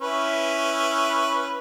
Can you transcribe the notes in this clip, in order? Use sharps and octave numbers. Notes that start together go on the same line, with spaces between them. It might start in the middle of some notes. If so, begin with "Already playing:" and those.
C#4 E4 B4